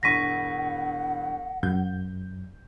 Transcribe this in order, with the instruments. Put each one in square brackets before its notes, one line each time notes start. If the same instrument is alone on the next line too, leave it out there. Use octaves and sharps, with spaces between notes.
[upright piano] E1 G2 C#6 [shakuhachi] F#5 [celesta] A#6 B6 D#7
[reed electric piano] F#2 [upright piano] G6